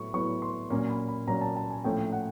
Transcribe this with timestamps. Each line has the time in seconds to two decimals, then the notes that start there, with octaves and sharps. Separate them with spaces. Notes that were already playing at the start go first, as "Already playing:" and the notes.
Already playing: A2 F#3 B3 E4 C#6
0.14 A2 F#3 B3 E4 C#6
0.42 C6
0.70 A#2 F#3 A#3 C#4
0.90 B5
1.09 B5
1.27 A#2 F#3 A#3 C#4 A#5
1.41 A5
1.57 A5
1.70 G#5
1.84 A2 F3 A3 C#4 E4 G5
2.12 F#5